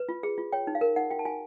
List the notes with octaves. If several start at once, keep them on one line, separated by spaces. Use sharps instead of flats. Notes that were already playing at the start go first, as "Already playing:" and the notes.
Already playing: B4
F4
G#4
F4
C#5 G5
D#4
F5
A#4
D#4 F#5
F#4 G5
A5
F#4 G#5